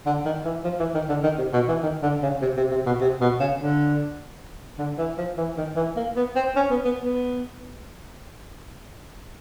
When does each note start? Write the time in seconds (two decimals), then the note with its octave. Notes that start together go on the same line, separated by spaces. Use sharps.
0.06 D3
0.26 D#3
0.45 E3
0.65 F3
0.80 E3
0.94 D#3
1.09 D3
1.24 D#3
1.39 C3
1.53 B2
1.69 E3
1.83 D#3
2.03 D3
2.23 C#3
2.42 C3
2.57 C3
2.71 C3
2.86 B2
3.01 C3
3.21 B2
3.40 C#3
3.60 D3
4.79 D3
4.98 E3
5.18 F3
5.38 E3
5.58 D#3
5.76 E3
5.97 A#3
6.16 B3
6.36 C4
6.56 C#4
6.71 B3
6.85 B3
7.00 B3